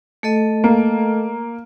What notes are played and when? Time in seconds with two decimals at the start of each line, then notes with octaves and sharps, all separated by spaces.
0.23 A3 A4 D#5
0.64 A#3